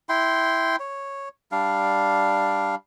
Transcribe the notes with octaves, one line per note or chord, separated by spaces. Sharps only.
E4 G5 C6
C#5
G3 D4 F5